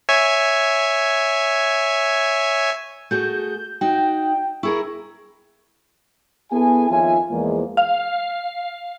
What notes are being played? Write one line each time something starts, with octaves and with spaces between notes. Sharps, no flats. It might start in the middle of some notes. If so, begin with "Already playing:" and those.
C#5 E5 G#5
A3 F#4 G#4 G6
D#4 F#4 G5
E4 G#4 A#4 C#6
B3 E4 G#4 A4 G#5
F2 D#3 F4 C#5 E5 G#5
E2 F3 G#3 A#3
F5